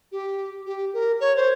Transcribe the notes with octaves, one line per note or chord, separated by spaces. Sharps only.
G4
G4
A#4
C#5
C5